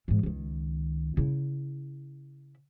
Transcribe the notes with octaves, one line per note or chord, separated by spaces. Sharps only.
G#2 E3
C#2 D#3
C#3 E4